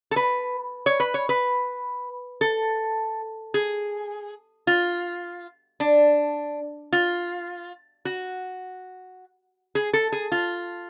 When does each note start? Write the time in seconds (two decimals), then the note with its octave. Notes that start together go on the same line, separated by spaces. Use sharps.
0.11 A4
0.16 B4
0.86 C#5
1.00 B4
1.14 C#5
1.29 B4
2.41 A4
3.54 G#4
4.67 F4
5.80 D4
6.93 F4
8.05 F#4
9.75 G#4
9.93 A4
10.12 G#4
10.32 F4